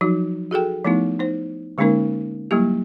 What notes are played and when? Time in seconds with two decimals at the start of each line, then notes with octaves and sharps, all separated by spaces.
0.01 F3 F#3 D#4 F#4
0.51 F#4 G#4 A4 G5
0.85 F3 A3 B3 D#4 E4
1.19 D#4 C5
1.78 D3 G#3 A#3 C#4 D#4 A#4
2.51 F#3 G3 A#3 E4 G4